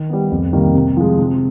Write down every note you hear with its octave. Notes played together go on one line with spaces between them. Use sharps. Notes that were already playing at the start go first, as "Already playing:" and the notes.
Already playing: D#3
G3 B3
F2
C3 D#3 G3 A#3
C3
F3 G#3
C3